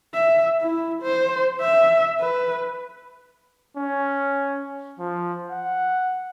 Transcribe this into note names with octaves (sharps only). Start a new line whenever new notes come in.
E5
E4
C5
E5
B4
C#4
F3
F#5